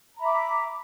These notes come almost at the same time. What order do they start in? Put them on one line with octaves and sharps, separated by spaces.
A#5 B5 E5 D6